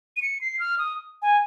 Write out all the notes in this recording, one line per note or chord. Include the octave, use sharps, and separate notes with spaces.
D#7
C#7
C7
F6
D#6
G#5